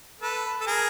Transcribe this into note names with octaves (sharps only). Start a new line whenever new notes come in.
A4 B4
A4
G#4 A#4